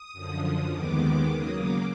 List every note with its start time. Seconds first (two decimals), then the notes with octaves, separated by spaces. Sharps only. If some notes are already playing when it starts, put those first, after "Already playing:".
Already playing: D#6
0.13 F#2 D3 F3
0.42 D#6
0.70 D#2 D#3 G#3 B3 D6
1.27 C#3 F#3 A#3 D#6
1.56 D6